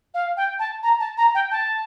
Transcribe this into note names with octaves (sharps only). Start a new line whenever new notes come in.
F5
G5
A5
A#5
A5
A#5
G5
A5